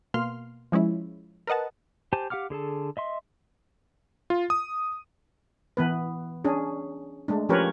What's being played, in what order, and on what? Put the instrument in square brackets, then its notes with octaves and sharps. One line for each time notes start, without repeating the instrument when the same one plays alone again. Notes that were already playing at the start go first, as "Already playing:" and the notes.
[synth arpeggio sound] B2 A#3 B3 F5 C6 F6
F3 G#3 C#4 E4
A#4 B4 D#5 F#5 A5
[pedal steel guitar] G4 C5 G#5 A5
G4 F5 F#5 D6 F6
D3 G#4 A4 A5
D#5 E5 C6
[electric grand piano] F4
D#6
[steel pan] E3 B3 B4
C#4 D4 G#4
G#3 A3 D4
F3 C#4 G4 A#4 B4 C#5